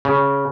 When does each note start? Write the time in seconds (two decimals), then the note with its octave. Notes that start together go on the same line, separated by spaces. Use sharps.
0.05 C#3